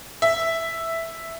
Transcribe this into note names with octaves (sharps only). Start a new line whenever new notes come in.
E5